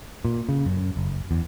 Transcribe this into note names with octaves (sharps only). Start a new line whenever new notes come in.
A#2
C#3
F#2
F#1
E2